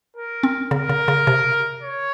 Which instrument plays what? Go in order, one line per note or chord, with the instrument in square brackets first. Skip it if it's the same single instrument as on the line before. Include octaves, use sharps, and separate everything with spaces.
[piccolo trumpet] A#4
[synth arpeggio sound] C4
[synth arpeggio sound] C#3 [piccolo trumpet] A#4
[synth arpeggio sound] C#3
C#3
C3
[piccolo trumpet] C#5